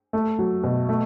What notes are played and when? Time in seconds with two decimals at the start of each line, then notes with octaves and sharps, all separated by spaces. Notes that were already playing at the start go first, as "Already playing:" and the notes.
0.13 A3
0.39 F#3
0.63 B2
0.89 A3